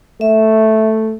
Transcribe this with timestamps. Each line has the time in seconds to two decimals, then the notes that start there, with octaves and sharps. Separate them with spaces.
0.21 A3 E5